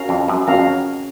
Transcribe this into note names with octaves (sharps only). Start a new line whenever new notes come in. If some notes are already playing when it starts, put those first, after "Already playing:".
Already playing: C#4 F#4 A#4 F5 A#5
F2
F#2
F2 C#4 F#4 A#4 F5 A#5